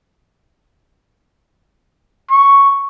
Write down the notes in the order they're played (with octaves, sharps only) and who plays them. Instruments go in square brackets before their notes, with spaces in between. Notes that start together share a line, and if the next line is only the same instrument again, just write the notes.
[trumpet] C#6